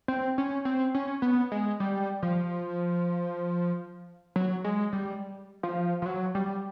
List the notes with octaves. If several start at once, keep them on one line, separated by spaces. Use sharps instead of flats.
C4
C#4
C4
C#4
B3
G#3
G3
F3
F#3
G#3
G3
F3
F3
F#3
G3